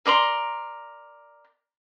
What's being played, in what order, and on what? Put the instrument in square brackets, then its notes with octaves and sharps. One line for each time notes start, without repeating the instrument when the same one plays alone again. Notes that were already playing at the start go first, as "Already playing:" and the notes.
[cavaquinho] A#4 D5 A#5 C6